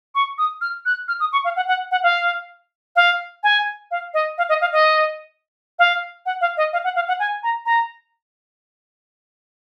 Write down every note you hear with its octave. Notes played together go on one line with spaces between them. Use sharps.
C#6
D#6
F6
F#6
F6
D#6
C#6
F5
F#5
F#5
F#5
F5
F5
G#5
F5
D#5
F5
D#5
F5
D#5
F5
F#5
F5
D#5
F5
F#5
F5
F#5
G#5
A#5
A#5